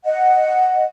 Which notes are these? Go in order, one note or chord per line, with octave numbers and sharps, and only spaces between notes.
D#5 F#5